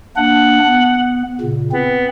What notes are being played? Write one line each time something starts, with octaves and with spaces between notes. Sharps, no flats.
A#3 D4 F#5
B3
A#2 C#3
B3 C4